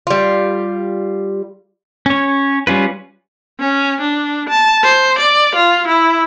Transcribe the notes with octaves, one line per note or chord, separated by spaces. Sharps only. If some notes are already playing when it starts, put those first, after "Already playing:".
G3 F4
C#4 C#5
G3 C#4 F4 B4
C#4
D4
A5
C5
D5
F4
E4